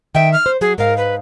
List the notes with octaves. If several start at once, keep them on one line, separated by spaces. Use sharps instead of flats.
D#3 E5 G5
F6
C5
F#3 G#4
G#2 A#4 F5
B4